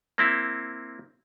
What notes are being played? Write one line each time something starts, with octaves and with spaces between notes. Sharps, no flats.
A#3 C4 E4